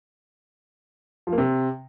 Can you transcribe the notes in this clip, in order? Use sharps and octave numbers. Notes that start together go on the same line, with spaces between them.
F3
A#3
C3